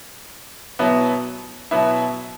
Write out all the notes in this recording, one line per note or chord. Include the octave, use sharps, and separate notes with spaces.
B2 F#3 B3 E4
B2 F#3 B3 E4